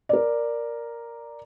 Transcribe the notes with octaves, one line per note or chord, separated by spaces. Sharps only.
A#4 D5